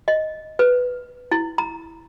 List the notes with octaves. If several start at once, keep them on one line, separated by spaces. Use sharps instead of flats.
D#5
B4
E4
A#5